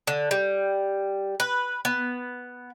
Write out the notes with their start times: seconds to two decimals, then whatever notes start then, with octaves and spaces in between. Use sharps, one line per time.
0.07 D3
0.31 G3
1.40 B4
1.85 B3